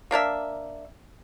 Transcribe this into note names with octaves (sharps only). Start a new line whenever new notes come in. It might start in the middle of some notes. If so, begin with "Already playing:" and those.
A#3 D4 A#4 E5